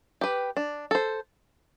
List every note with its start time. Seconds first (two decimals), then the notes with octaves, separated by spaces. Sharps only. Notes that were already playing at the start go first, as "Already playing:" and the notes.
0.21 G4 B4
0.57 D4
0.91 A4 C5